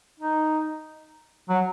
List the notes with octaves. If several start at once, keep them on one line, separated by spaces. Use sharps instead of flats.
D#4
F#3